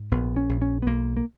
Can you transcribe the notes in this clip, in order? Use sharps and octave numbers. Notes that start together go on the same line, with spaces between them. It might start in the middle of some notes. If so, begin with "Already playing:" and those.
Already playing: G#2
A#1 B3
C#4
A#1
C#4
B3
B1 A#3
A#3